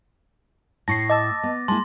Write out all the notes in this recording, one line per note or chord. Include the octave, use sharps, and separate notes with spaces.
A2 E4 A5 C#6 A#6 C7
D#5 A5 D6 E6 A6
B3
G#3 A#3 E4 A5 C6